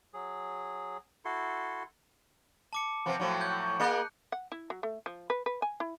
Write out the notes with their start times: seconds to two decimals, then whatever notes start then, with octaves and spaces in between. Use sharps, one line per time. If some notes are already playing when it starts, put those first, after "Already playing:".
0.14 F#3 G#4
1.25 E4 F#4 A4 C6
2.73 A5 D6 C#7
3.06 C3 F3 B3
3.20 A2 F3 F#3
3.41 G6
3.80 A#3 G#4 D#5 F#6 C#7
4.32 F#5
4.52 E4
4.70 F#3
4.83 A3
5.06 F3
5.30 B4
5.46 B4
5.62 G#5
5.80 E4